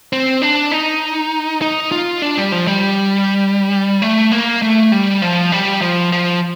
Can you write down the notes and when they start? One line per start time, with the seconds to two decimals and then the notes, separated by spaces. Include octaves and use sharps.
0.13 C4
0.42 D4
0.72 D#4
1.62 D#4
1.92 F4
2.22 D4
2.38 G3
2.52 F3
2.67 G3
4.02 A3
4.32 A#3
4.62 A3
4.92 G3
5.22 F3
5.52 G3
5.82 F3
6.12 F3